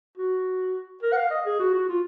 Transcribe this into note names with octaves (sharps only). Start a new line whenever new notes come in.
F#4
A#4
F#5
F5
D#5
G#4
F#4
F#4
F4